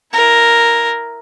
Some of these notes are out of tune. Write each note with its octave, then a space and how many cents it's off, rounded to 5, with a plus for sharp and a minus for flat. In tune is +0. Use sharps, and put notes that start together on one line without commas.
E4 +0 A#4 +0